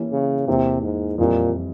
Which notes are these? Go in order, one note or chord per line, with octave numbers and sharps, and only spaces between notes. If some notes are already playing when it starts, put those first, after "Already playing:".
Already playing: E3 A#3 C#4 G4
C#3
E2 C3 E3 A#3
G#2
F2 A#2 E3 G3